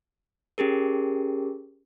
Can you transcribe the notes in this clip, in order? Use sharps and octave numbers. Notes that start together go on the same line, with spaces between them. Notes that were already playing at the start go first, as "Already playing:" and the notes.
C#4 G4 G#4 A#4